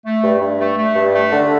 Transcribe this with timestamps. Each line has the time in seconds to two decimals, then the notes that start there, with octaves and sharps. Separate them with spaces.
0.06 A3
0.23 G2
0.41 G2
0.60 A3
0.78 A3
0.96 G2
1.14 A3
1.32 D3